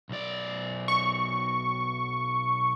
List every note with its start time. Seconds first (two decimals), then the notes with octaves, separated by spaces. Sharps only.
0.09 B1 D5
0.88 C#6